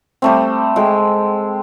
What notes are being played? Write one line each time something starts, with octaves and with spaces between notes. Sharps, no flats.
G3 A3 C4
G#3 A4 G5